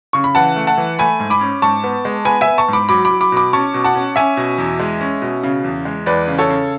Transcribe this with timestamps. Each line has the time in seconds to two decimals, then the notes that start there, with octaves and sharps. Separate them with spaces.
0.13 C#3 C#6
0.24 B5
0.35 E3 F#5 A5
0.56 A3
0.67 F#5 A5
0.78 E3
0.99 A3 G#5 B5
1.20 G#2
1.30 B5 D6
1.41 C#4
1.62 G#2 A5 C#6
1.84 B3
2.05 G#3
2.25 B3 G#5 B5
2.41 E5 G#5
2.48 B3
2.58 A5 C#6
2.68 G#2 B5 D6
2.89 F#3 B5 D6
3.05 B5 D6
3.11 F#3
3.21 B5 D6
3.32 B2 B5 D6
3.53 C#4 A5 C#6
3.74 B2
3.84 F#5 A5
3.95 C#4
4.16 C#4 E5 G#5
4.37 B2
4.58 E2
4.80 G#3
5.01 C#4
5.22 B2
5.43 C#3
5.64 E2
5.85 G#3
6.06 E2 B4 D5
6.28 C#3
6.38 A4 C#5
6.49 C#3